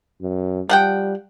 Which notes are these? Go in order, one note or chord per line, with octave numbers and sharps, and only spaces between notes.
F#2
F3 G3 F#5 G5